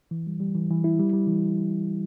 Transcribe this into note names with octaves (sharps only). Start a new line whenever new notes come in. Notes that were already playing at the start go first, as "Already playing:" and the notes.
E3
G3
G3
E3
E3
E4
G3
G3
E3